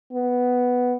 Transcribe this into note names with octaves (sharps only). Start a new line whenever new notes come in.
B3